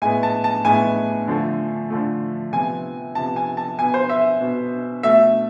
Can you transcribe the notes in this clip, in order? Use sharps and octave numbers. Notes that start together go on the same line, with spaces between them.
A2 G#3 B3 G#5
A5
A5
A2 G#3 B3 G#5
D3 F3 A3
D3 F3 A3
C3 F3 B3 G#5
C3 F3 B3 A5
G#5
A5
B2 B3 G#5
C5
E5
B2 B3
B2 A3 E5